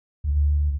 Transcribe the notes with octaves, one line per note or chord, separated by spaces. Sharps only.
D2